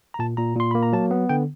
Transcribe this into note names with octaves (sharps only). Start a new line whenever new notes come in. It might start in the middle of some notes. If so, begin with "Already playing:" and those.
A#5
A#2 A5
A#2 A#5
A#2 C6
A#3 B5
A#5
F#3 A5
B3
D3 G5